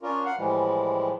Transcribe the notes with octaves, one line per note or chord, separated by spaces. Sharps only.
C#4 D4 F4 A#4
F5 F#5
A2 E3 F3 G3 G#3